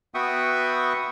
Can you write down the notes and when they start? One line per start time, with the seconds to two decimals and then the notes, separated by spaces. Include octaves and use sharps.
0.14 B3 F#4 E5 G5 C#6 D#6